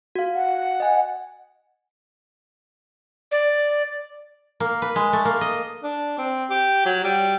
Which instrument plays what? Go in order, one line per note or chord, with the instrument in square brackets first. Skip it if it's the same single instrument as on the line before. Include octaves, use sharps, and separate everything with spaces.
[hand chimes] F#4 F5
[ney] F#5
[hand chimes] D#5 G#5
[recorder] D5
[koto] A#3
B4
G#3
A3
A#3
D#5
[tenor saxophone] D4
C4
G4
F#3
G3